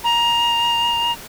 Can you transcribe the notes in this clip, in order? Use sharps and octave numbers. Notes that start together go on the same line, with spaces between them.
A#5